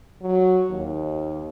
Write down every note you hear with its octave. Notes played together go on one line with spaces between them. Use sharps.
F#3
D#2